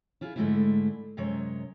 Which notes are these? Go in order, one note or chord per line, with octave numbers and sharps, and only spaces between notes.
E4 F4 G#4
G#2 D3 G#3 A3 D4 E4
F#2 C3 G#3 C#5